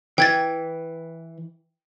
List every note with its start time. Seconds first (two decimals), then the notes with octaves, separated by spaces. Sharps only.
0.18 E3 G5 G#6 A6